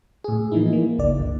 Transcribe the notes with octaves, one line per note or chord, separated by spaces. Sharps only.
A2 G#4
E3 F3 A#3 D#4 E4
A#3
G1 C#2 D5
D3